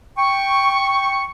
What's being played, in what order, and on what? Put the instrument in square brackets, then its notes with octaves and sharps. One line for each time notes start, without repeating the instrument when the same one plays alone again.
[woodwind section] G5 C#6